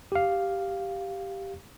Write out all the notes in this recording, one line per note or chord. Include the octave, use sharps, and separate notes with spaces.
G4 F5